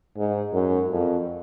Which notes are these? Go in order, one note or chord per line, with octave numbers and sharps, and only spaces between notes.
G#2
F#2
F2